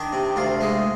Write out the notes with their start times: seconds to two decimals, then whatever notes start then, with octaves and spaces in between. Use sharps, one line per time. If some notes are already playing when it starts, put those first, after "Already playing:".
Already playing: D#3 D4
0.12 C3
0.36 D2 F4
0.61 G#3